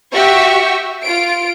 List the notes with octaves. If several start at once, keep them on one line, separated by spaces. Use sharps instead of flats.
F#4 G4 E5 C#6
F4 D7